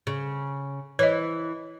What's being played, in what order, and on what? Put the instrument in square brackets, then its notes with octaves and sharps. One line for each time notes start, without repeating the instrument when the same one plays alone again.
[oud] C#3
[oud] E3 [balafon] C#5 D#5